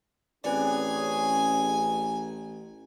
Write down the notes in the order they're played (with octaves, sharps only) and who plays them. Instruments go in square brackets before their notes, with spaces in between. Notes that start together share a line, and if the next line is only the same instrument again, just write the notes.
[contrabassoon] A1 [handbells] C4 B4 D5 [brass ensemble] C#4 G#4 C#5 [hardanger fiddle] G#5